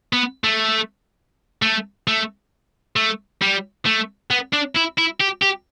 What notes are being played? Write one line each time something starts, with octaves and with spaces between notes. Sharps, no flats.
B3
A3
A3
A3
A3
G3
A3
B3
D4
E4
E4
G4
G4